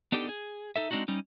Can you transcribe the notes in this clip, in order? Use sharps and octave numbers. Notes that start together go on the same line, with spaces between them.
B3 D4 D#4 G4 A4
G#4
D#4 A4 E5
G#3 C4 D4 D#4 F#4
G3 C#4 D#4